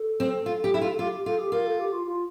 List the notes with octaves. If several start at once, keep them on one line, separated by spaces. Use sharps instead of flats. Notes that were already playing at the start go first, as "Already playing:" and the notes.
Already playing: A4
C4
F4
G4
E4
F4
A4
F4 G4
G4
F4 A4
G4
F4 A#4
A4
G4
F4
F4